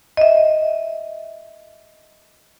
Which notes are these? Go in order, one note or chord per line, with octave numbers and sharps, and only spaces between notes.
D#5 E5